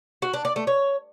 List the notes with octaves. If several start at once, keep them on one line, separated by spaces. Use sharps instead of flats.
F#4
D4
D5
A3
C#5